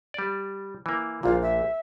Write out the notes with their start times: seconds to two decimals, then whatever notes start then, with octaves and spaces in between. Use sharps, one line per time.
0.14 G3 D5
0.86 E3 A#3
1.23 A#1 A#2 F4
1.42 E5